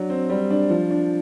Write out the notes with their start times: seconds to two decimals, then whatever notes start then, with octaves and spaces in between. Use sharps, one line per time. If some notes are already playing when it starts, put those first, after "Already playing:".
Already playing: F#3 D4
0.10 C4
0.30 G3
0.50 D4
0.70 F3
0.91 D4